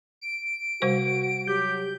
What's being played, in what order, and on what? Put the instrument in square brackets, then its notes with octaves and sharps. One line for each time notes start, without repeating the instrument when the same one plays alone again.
[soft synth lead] D7
[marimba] C3 G3 C5 [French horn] F#4
[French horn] F#3 [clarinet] G4 [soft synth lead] G6